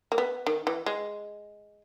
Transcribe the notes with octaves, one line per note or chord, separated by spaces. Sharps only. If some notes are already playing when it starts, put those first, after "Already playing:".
A#3
B3
D#3
E3
G#3